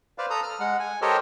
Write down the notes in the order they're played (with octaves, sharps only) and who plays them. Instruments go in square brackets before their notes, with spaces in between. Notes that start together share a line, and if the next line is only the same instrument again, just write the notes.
[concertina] B4 C5 D5 F5
A4 A#5 D#6
F6
G#3 F#5
G#5
G4 A4 A#4 C5 C#5 D#5